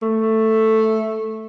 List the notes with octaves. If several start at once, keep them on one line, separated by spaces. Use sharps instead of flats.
A3